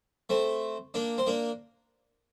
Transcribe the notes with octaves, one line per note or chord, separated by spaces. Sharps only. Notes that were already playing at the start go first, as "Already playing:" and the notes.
A3 C4
A#3 D4
C4
A#3 D4